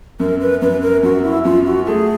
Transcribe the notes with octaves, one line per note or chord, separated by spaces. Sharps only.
F#2 A#4
B4
F#2 B4
A#4
F#2 F#4
E4
F#2 F4
F#4
A3 G#4